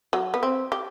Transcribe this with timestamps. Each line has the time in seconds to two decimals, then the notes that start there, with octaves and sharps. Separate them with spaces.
0.13 F#3
0.34 B3
0.43 C4
0.72 G4